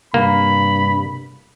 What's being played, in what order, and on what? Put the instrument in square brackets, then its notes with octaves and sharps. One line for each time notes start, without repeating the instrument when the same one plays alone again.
[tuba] G2 [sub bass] C3 [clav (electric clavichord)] A#3 [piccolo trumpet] B5